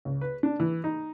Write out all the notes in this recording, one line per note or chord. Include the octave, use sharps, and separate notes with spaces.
C#2
B4
D4
E3
D#4